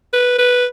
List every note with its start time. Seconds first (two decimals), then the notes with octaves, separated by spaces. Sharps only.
0.13 B4
0.38 B4